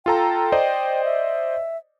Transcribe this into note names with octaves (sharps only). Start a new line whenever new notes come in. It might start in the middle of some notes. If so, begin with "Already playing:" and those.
F4 A4 G5 A#5
C5 D5 D#5
E5